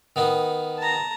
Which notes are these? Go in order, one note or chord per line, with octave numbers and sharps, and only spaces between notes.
D#3 B3 D#4
A5 A#5